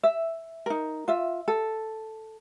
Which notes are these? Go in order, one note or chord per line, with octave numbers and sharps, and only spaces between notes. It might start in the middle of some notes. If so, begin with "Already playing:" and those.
E5
D#4 A#4
F4 E5
A4